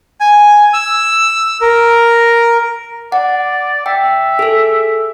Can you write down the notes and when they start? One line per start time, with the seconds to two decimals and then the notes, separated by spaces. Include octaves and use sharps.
0.21 G#5
0.73 E6
1.61 A#4
3.12 D5 F#5
3.86 E5 G5
4.39 G#4 A4